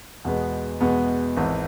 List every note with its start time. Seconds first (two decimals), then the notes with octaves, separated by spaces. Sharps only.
0.25 E2 B2 G#3 B3
0.81 E2 B2 G#3 B3
1.37 G#1 G#2 E3